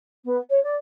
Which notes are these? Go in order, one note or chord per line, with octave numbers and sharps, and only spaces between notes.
B3
C#5
D5